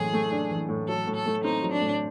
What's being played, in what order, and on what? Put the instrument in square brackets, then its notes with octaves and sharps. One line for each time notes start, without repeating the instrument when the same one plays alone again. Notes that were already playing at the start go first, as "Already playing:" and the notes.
Already playing: [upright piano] F#1 A2 E3 [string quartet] G#4
[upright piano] A3
D4
E3
A2
[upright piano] F#3 [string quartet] A4
[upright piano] A2
[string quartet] A4
[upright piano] A3
[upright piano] C4 [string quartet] D#4
[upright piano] F#3
[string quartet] D4
[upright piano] A2